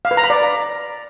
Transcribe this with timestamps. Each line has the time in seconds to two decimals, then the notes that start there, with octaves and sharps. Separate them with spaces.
0.05 F5
0.11 B4
0.17 A#5
0.24 B5
0.30 D5